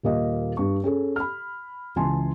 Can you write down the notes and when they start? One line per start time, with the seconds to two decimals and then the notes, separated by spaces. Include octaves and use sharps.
0.03 D#1 A#3 D#5
0.57 G2 C#6
0.84 C#4 G#4 A4
1.16 B5 F6
1.96 C#2 E3 G#5 A5 C6